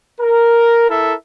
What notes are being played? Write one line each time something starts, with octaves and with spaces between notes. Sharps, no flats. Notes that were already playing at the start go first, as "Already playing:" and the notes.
A#4
E4 A4 A#4 E5